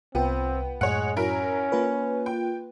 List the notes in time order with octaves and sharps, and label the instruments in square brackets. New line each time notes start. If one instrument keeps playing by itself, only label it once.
[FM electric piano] C2 F4 G5 [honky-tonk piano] B3 [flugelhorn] C4
[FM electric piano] F#2 A2 [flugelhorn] G#3 [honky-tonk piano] C#5 F#5
[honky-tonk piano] F#3 E4 A#4 [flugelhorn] C#4
[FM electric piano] A#3 F4 B4
[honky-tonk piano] G5